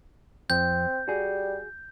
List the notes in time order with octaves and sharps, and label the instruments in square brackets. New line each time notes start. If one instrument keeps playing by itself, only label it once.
[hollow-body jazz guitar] F2 [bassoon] C4 [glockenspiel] G6
[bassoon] G3 [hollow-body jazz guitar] F#4 G#4